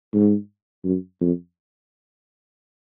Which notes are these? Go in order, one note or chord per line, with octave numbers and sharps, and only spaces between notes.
G#2
F#2
F2